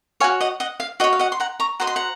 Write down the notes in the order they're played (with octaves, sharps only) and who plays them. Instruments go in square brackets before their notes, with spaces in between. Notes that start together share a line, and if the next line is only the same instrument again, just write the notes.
[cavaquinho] C#5 F5 G#5
F#4
D#5 F#5
D#5 F#5
F5
F#4 D#5
C#5
F5
D#5 F#5
C6
F#5 A#5
A#5 C#6
F#4 C5 D#5 A#5
C6
F#5 A#5